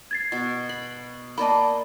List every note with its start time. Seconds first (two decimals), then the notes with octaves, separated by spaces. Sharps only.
0.11 G#6 A6 C7
0.32 B2
0.69 B5
1.38 A#3 D5 D#5 A5 B5